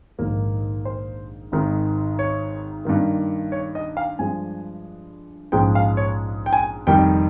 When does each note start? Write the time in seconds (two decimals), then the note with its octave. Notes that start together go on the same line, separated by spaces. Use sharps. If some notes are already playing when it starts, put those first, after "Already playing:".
0.19 A#1 G#2 D#3 A#3
0.85 C5
1.52 G#1 G#2 D#3
2.19 C#5
2.85 G2 D#3 A#3
3.52 C#5
3.75 D#5
3.97 F5
4.19 G2 F3 G#3 G#5
5.52 A#1 G#2 F3 G#3 C#4 G5
5.75 F5
5.97 C#5
6.46 G5
6.53 G#5
6.86 F1 F2 D#3 G3 G5